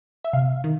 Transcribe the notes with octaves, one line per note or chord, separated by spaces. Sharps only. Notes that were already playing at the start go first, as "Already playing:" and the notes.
E5
C3 F5
D#3